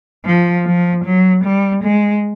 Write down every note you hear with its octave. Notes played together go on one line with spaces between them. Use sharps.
F3
F3
F#3
G3
G#3